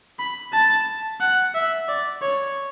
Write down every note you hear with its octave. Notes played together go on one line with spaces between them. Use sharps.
B5
A5
F#5
E5
D5
C#5